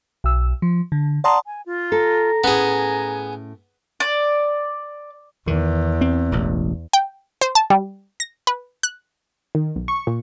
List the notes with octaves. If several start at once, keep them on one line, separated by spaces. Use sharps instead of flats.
B1 E6
F3
D3
D5 F#5 A5 A#5 C6 D#6
G#5
F4
A4 A#5
A2 B3 C#4 G#4 G#5
D5
E2 D#3
C4
E1 A1
G5
C5
A5
G3
A#6
B4
F#6
D#3
B1
C#6
A#2